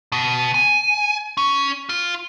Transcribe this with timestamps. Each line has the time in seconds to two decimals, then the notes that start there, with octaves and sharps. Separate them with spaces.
0.12 B2
0.54 G#5
1.37 C#4
1.89 F4